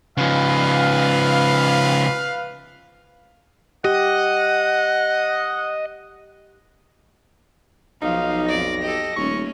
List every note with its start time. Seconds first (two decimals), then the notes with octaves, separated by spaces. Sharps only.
0.17 C#3 F3 B4 F5
3.85 G4 D#5 F#5
8.02 B1 F3 D#4 F5
8.49 F2 D5 A#6
8.83 G4 A4 D#5
9.16 D#1 A3 C#4 C#6